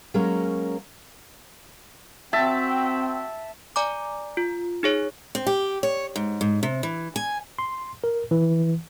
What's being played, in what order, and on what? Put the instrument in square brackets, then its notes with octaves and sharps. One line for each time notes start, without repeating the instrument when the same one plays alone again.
[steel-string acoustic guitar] F#3 G#3 A#3 C#4 A#4
[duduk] C4 [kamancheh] F#4 G5 [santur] E5 A5
[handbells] D5 G#5 A#5 D6
F4
D#4 G#4 C#5
[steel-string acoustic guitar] C4
G4
C#5
G#2
G#2
C3
E3
G#5
[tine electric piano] C6
A#4
E3